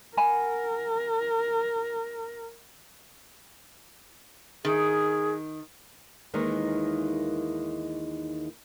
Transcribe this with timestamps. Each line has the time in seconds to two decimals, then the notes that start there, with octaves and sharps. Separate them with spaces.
0.17 A#4 F#5 G#5 B5
4.65 D#3 G#4
6.34 D#2 D#3 E3 G#3 D#4